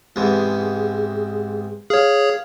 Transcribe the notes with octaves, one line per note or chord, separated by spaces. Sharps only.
E2 G#2 C3 G#4
G#4 C#5 F5